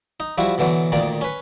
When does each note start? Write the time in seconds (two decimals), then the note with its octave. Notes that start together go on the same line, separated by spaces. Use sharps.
0.20 D#4
0.38 F3 G3 E4 F#4
0.58 B2 D3 E3 F#3
0.92 D2 A#2 D#3 D5
1.21 C#4 B4